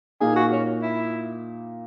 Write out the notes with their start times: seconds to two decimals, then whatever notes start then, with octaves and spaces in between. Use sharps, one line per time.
0.20 A#2 A#3 D#4 G#4
0.36 F#4
0.52 C#4
0.82 E4